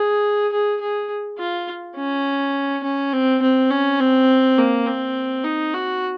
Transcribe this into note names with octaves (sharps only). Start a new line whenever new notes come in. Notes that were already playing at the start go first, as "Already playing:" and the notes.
Already playing: G#4
G#4
G#4
F4
C#4
C#4
C4
C4
C#4
C4
A#3
C4
D#4
F#4